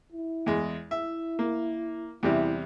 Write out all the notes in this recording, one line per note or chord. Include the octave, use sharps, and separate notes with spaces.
E4
E2 G#3
E4 E5
A#3
E2 C3 G3 E4